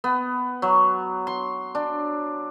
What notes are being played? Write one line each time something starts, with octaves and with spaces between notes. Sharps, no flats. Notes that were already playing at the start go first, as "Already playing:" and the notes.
B3
F#3
C6
D4